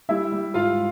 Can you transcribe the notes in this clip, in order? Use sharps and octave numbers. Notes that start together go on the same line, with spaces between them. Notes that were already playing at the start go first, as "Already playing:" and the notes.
G3 E4 E5
G3
G#2 F4 F5